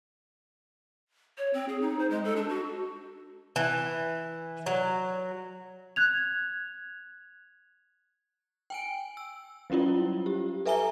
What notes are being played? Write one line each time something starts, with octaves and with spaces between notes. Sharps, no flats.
C#5
C4
G#4
D#4
C5
G#3
A4
D4
F#4
E3
F#3
F#6 G#6 F7
G5 G#5 D7
E6
F#3 G3 C#4 E4 F4
G4
A4 B4 E5 G#5 A#5 G7